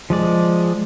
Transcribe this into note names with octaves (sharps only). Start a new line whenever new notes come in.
F3 G#3 D5